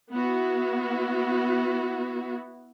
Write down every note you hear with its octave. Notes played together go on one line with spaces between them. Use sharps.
B3 E4 F#4